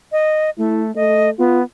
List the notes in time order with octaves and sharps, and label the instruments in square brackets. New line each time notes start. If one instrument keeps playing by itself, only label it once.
[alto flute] D#5
[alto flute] A3 [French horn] E4
[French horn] A3 [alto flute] D#5
[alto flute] B3 [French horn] F4